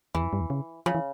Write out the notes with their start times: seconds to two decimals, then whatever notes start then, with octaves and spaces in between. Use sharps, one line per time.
0.15 E2 E3
0.23 F2
0.33 G2
0.41 E2
0.50 C#3
0.86 C#3 F3
0.95 E3